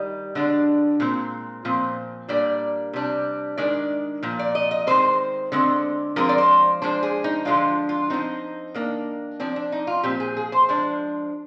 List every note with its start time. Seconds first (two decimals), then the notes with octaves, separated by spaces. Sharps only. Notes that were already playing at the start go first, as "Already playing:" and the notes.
Already playing: D#3 G3 D#5
0.35 D3 G#3 D4
1.00 A#2 G#3 C4
1.65 A#2 F3 C4
2.29 A#2 G3 A#3 D4 D5
2.93 C3 G3 D4
3.58 D#3 G#3 D4 D5
4.23 A#2 F3
4.39 D5
4.55 D#5
4.71 D#5
4.87 D#3 G#3 C4 C5
5.52 D3 G#3 C4
6.16 F3 G#3 C4 A#4
6.29 D5
6.38 C5
6.82 F3 G#3 D4 C5
7.03 G#4
7.24 D#4
7.45 D3 F3 G#3 D4 F4
7.89 F4
8.10 F3 C4 D#4
8.74 D#3 A#3 D4
9.40 F3 C4 D4
9.56 D4
9.72 D#4
9.87 F4
10.03 A#2 F3 C4 G4
10.20 G#4
10.37 G#4
10.52 C5
10.69 F3 G#3 D4